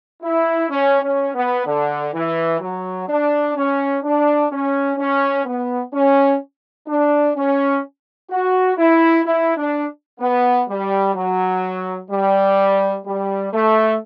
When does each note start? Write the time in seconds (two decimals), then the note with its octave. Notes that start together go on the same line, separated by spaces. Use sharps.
0.23 E4
0.70 C#4
1.02 C#4
1.35 B3
1.66 D3
2.14 E3
2.60 F#3
3.09 D4
3.55 C#4
4.03 D4
4.51 C#4
4.97 C#4
5.45 B3
5.93 C#4
6.88 D4
7.36 C#4
8.30 F#4
8.77 E4
9.25 E4
9.57 D4
10.20 B3
10.68 G3
11.14 F#3
12.10 G3
13.05 G3
13.53 A3